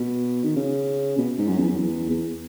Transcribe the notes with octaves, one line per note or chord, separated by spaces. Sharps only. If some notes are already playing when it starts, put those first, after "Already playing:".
Already playing: B2
D#3
C#3
B2
G#2
F#2
E2
F#2
E2
E2